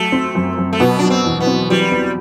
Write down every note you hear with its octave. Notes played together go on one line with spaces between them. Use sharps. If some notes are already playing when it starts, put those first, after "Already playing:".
Already playing: F#3 A3
C4
F#2
F#2
A3
B2 B3
F#3 D4
C4
E2
B3
C4
F#3 G3
B3